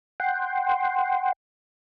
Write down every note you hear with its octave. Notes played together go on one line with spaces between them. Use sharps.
F#5 G5 C6